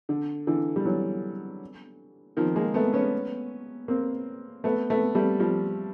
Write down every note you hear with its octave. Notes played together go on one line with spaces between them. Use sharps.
D3
D3 E3
G3
E3 F#3
D#3 F3
G#3 A#3
A3 B3
B3 C#4
A#3 C4
A3 B3
A3 B3
G3 A3
F3 G3